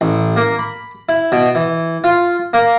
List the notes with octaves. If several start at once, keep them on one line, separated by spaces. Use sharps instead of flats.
A1
A#3
B5
E4
B2
E3
F4
A#3